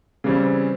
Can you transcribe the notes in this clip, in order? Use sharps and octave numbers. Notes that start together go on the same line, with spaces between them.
C#3 E3 G3 C4